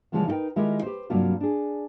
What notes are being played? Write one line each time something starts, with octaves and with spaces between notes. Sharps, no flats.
C#3 E3 F3 G3 G#3 B3
D#4 E4 A#4 B4 G5
D#3 G#3 E4 F4 G4 A#4
G4 B4 C5
G2 C3 F#3 G3 A#3 F4
D4 G#4